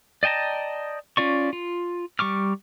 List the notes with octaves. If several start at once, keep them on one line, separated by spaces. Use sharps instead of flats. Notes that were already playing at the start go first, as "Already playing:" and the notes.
D5 D#5 G5 A5 A#5
C#4 F4 D5 C#6
F4
G3 C#6 D6 F6